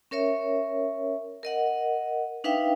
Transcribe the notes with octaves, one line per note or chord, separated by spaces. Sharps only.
C#4 A#4 C#5 E5
A#4 D#5 F#5
D4 D#4 B4 E5 F5 G5